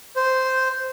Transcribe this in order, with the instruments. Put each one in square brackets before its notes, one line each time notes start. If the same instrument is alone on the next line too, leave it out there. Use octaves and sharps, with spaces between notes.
[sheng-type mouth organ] C5